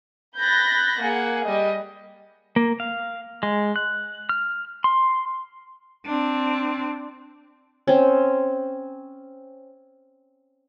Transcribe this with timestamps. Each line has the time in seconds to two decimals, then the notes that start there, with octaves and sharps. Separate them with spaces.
0.38 B5 F#6 G6 A6 A#6
1.02 A#3 G#4 F#5
1.45 G3 D#5
2.56 A#3
2.80 F5
3.43 G#3
3.76 F#6
4.29 F6
4.84 C6
6.06 C4 D4
7.88 C4 C#4